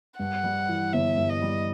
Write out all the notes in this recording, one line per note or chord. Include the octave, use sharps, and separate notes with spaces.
G2 F#5
G3
E3
G1 E5
G2
D#5
G3